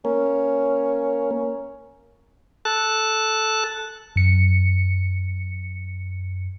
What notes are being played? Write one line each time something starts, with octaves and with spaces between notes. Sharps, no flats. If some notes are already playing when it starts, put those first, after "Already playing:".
A#3 C#4 A#4
A4 A5 F#6
F#2 C#7